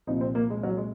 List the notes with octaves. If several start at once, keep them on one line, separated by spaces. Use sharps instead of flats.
C2 A#2 F3 D#4
C4
A#3
G#3
F#3
G#3